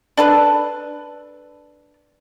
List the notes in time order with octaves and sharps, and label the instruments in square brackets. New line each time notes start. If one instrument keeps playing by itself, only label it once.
[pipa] D4 A4 B4